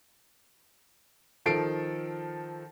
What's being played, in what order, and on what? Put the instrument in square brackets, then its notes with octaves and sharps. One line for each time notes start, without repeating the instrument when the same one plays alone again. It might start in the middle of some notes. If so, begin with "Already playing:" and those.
[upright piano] D#3 F3 A4 C7 D7